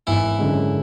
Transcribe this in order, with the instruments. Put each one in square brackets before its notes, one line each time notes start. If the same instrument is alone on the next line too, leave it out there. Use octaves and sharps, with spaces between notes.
[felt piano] G#1 [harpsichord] E3 E4
[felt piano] F#2 D3 G#3